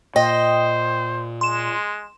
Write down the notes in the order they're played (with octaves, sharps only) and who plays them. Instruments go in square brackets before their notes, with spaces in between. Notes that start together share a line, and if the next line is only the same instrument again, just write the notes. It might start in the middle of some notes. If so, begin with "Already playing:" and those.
[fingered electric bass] A#2 [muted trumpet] C5 [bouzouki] D#5 [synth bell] G5
[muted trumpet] G#3 [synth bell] C6 E7